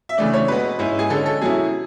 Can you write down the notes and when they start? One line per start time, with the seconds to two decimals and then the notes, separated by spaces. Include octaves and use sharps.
0.09 E5
0.17 C#3 E3 A3 D4 D5
0.34 C#5
0.48 B2 G#3 B3 B4
0.79 G#2 G#3 C#4 E4
0.99 G#4
1.10 D3 G#3 C#4 A4
1.26 A4
1.41 B2 F#3 C#4 E4 G#4